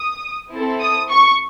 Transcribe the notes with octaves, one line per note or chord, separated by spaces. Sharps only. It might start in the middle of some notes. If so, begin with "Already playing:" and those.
Already playing: D#6
C4 E4 A4
D#6
C#6